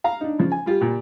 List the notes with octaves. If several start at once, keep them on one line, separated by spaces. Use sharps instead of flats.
F5 A#5
D4 D#4
C#3 F3
G#5
G3 F4 G4
A#2 G4